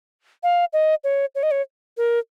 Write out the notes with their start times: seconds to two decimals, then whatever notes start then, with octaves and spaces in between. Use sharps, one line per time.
0.43 F5
0.73 D#5
1.04 C#5
1.35 C#5
1.43 D#5
1.51 C#5
1.97 A#4